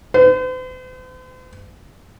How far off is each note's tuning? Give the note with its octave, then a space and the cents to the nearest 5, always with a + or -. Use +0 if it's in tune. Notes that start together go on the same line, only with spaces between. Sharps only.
C5 -45